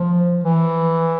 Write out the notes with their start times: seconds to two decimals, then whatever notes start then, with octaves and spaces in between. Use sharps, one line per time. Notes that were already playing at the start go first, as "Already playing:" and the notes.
Already playing: F3
0.44 E3